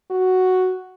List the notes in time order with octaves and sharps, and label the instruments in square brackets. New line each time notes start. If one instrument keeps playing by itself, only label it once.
[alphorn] F#4